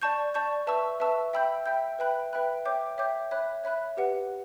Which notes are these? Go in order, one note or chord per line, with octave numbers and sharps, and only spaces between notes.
D5 A5 C#6 G6
D5 A5 C#6 G6
B4 E5 A5 C#6 E6
B4 E5 A5 C#6 E6
E5 G5 B5 E6 G6
E5 G5 B5 E6 G6
B4 E5 G5 B5 F#6
B4 E5 G5 B5 F#6
C#5 E5 G5 D6 G6
C#5 E5 G5 D6 G6
C#5 E5 B5 F#6
C#5 E5 B5 F#6
G4 B4 F#5